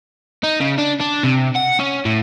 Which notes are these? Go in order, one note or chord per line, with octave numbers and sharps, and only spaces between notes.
D#4
C#3
D4
D4
C3
F#5
C#4
A2